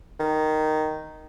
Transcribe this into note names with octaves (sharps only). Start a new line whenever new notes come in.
D#3